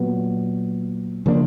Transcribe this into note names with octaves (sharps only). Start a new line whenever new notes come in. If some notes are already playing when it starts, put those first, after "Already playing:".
Already playing: A#2 F#3 B3
C#3 F3 A#3 D4